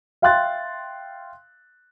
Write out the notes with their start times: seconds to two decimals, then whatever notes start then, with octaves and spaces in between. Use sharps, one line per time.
0.22 E5 F5 G5 C6 F#6 A6